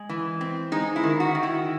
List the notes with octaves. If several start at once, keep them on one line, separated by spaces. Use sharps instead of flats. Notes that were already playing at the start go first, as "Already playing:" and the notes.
Already playing: G#3
E3
C4
G#3 D#4
E4
D#3
F#4
D#3
E4